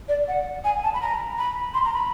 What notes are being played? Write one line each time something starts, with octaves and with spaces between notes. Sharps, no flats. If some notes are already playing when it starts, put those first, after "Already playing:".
D5
F#5
G#5
A5
B5
A#5
B5
C6
A#5
B5